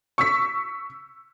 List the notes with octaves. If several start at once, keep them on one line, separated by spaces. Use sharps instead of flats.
C#6 E6 B6